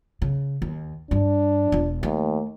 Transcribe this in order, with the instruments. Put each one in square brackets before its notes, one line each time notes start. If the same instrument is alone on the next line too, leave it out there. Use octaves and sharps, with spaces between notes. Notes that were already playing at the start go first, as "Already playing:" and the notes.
[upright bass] C#3
D#2
[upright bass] G2 [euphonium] D4
[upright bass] E1 F4
[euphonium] D#2 [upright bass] A3